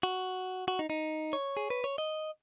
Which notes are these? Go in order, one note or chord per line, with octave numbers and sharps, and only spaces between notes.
F#4
F#4
D#4
D#4
C#5
G#4
B4
C#5
D#5